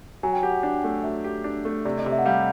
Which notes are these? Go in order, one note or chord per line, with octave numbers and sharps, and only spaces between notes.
F#3 G#5
G5
G4 F#5
F#5
D4
A3
F#3 E5
G4
D4
A3
C3 D5
D#5
C3
E5
F#5
G3 F5